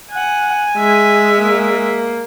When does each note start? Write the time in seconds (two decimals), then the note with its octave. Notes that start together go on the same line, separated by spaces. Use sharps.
0.13 F#5 G#5
0.77 G#3 E5
1.41 A#3